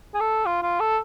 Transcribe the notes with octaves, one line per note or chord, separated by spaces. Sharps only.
G#4
A4
F4
F4
A4